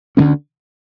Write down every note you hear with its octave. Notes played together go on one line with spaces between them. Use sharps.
D2 D3 G3 C#4